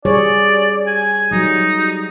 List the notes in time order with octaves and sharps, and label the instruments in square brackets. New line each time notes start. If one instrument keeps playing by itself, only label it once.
[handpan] G3 G#4 C#5 [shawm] D5
[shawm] G#5
[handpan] F#3 G3 [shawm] D#4